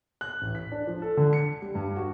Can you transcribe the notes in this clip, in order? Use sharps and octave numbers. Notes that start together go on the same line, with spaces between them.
F#6
A1
B6
D4
F3
A4
D3
C#7
G3
G2
F#4